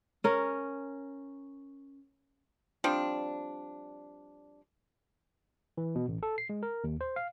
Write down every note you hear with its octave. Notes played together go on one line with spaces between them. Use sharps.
C#4 A#4
F3 G3 C4 D4
E3
B2
A1
A4
C7
G#3
A#4
D#2
C5
F5